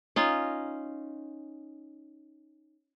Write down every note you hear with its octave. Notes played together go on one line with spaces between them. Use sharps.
C#4 D#4 F4